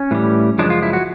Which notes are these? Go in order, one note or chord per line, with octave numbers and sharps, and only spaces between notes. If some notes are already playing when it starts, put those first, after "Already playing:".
Already playing: C#4
A2 E3 G3
F#2 C#3 F3 G#3 D4
F4
E4
F#4